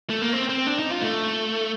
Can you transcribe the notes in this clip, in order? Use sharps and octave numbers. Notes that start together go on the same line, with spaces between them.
A3
A#3
C4
C4
D4
D#4
F4
A3